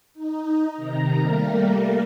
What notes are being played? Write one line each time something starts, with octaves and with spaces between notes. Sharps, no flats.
D#4
C3 D#3 A#5
G3 A3 A#3 A#4